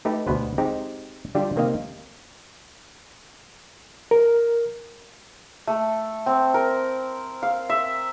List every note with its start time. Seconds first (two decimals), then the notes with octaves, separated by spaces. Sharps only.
0.05 A3 D#4 G4 B4
0.27 D2 B2 B3 B4 C5
0.58 G#3 C4 D#4 G4
1.35 D3 G3 D4 F4 G4
1.56 C3 D#3 A#3 C4 D#5 F5
4.11 A#4
5.67 A3
6.26 C4
6.54 A#4
7.43 F5
7.70 E5